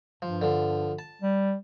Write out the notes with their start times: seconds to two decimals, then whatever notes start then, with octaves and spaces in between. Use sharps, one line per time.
0.22 G2 F3
0.42 D3 F3
0.99 A5
1.21 G3